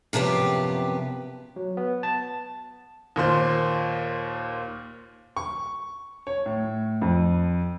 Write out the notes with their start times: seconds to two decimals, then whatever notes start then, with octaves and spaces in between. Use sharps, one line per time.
0.13 F#2 C3 F3 B3 G4
1.56 F#3
1.77 B3
2.03 A5
3.16 D#2 A#2 C5 C6
5.37 C#6
6.27 C#5
6.46 A2
7.02 F2